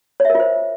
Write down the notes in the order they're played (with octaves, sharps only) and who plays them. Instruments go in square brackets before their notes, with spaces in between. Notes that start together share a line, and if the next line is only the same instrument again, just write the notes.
[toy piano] C#5
E5
A#4
F4
C5